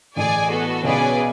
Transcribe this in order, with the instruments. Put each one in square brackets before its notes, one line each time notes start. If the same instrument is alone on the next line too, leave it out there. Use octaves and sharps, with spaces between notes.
[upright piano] A1 A2 [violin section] G#4 D5 G#5
[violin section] B3 F#4 A4
[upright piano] B1 B2 [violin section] C#4 G#4 B4 D5 G#5